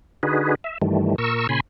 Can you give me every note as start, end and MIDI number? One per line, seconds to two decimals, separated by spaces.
0.23 0.55 50
0.23 0.55 63
0.23 0.55 66
0.23 0.55 68
0.23 0.55 71
0.64 0.78 76
0.82 1.16 43
0.82 1.16 51
0.82 1.16 52
0.82 1.16 55
0.82 1.16 57
1.18 1.47 46
1.18 1.47 70
1.18 1.47 85
1.18 1.47 88
1.49 1.60 46
1.49 1.60 49
1.49 1.60 80
1.49 1.60 83
1.49 1.60 84